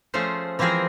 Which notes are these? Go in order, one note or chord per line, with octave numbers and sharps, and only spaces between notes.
F3 A3 C#4 G#4 C5
E3 F3 G#3 C4 G#4 A#4